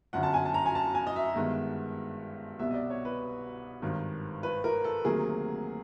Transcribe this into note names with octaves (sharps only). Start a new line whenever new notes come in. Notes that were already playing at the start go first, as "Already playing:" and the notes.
G1 F#2 D3 F#5
A5
G#5
A5
A#5
G#5
A5
G#5
D#5
E5
G2 D#3 G#3 B3
C2 B2 G3 B3 E5
D#5
D5
C#5
B4
G#1 G2 D#3
B4
A#4
A4
D2 C3 D#3 F#3 A#3 G#4